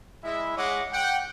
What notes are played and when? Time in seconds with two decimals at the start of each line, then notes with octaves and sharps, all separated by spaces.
0.24 G#3 E4 E5
0.57 G#3 G#4 C#5 D#5 F#5 D6
0.93 F#5 G5